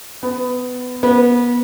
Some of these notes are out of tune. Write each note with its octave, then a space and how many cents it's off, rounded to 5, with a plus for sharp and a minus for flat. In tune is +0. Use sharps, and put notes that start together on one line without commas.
B3 +20
B3 -30